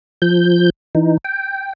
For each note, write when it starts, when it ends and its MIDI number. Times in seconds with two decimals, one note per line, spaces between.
0.22 0.70 53
0.22 0.70 91
0.95 1.17 52
0.95 1.17 63
1.25 1.73 79